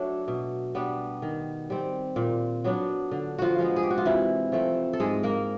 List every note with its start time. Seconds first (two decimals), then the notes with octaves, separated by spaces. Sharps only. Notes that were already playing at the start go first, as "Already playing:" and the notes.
Already playing: F#3 A3 D4
0.28 B2
0.75 G3 B3 D4
1.22 D#3
1.70 G3 C4
2.16 A#2
2.64 F#3 B3 D4
3.11 D3
3.39 F3 F4 F#4
3.59 F3 G#3 B3
3.76 G#4
3.83 G4
3.90 F#4
3.98 F4
4.05 C3 E3 E4
4.52 F3 A3 C4
4.93 A4
5.00 G#2 G#3 G#4
5.23 A#3 A#4